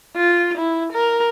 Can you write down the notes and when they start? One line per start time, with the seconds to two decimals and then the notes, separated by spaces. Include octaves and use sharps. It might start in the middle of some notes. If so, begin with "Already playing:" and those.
0.16 F4
0.58 E4
0.93 A#4